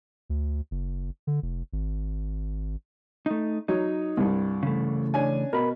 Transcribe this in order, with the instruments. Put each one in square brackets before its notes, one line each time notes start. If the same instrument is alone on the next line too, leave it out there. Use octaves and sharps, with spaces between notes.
[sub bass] D2
F#1
D3
F1
G#1
[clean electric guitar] A3 D#4
[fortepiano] F#3 C#5 [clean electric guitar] D#4
[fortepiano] C2 G2
[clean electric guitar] C#3 E3 A3
[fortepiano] C#4 D4 G#5
[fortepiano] B2 [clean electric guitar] A#4 B5